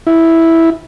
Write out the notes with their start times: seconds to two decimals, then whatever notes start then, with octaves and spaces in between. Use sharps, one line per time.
0.07 E4